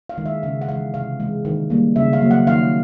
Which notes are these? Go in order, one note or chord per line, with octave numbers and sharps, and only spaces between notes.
F5
D#3 G#3
E5
C#3 F5
F#5
E3 G#3 F5
C3 F5
E3 G#3
D#3
G3 A#3
C#3 E5
F5
F#3 A#3
F#5
D#3 F5